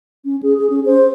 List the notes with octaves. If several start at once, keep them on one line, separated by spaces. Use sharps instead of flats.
C#4
G#4
G#4
C#4
C5